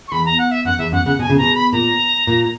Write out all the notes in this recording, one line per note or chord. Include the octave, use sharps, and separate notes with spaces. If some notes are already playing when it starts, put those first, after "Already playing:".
C#6
E2 B5
A#5
F#5
E5
F#2 F#5
E2 E5
F#2 F#5
C#3 F#5
B2 G#5
C#3
B2 A#5
B5
A#2 A#5
A#2